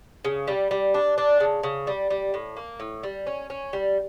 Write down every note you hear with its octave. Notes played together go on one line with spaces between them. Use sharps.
C#3
G3
G3
D4
D4
C#3
C#3
G3
G3
A2
A#3
A2
G3
C#4
C#4
G3